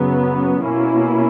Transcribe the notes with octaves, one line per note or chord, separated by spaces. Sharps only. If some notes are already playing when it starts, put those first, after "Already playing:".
Already playing: F#2 C#3 F#3 B3
B2 A#3 C#4 E4